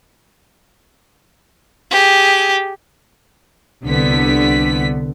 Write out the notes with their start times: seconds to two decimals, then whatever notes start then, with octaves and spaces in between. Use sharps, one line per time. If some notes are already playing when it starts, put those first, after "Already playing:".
1.91 G4 G#4
3.84 C2 D3 B3 B6